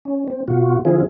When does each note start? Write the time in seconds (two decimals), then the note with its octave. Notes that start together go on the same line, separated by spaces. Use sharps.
0.05 C#4
0.28 C4
0.48 B2 F4 F#4
0.85 D3 F3 C4 E4 F4 G#4